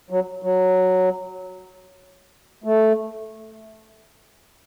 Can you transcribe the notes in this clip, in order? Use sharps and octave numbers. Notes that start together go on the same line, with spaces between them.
F#3
F#3
A3